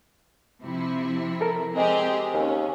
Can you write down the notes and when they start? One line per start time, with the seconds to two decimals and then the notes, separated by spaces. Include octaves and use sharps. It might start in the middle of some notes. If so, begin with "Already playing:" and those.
0.63 C3 F3 E4
1.41 A4 A#4
1.76 G#3 C4 G4 G#4
2.34 D#2 C#4